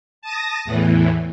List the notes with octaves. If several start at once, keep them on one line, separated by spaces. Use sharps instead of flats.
A5 D#6 A#6
E2 A2 E3